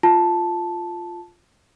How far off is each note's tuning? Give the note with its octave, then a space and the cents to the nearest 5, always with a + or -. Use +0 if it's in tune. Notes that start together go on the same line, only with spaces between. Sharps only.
F4 +0 A5 -5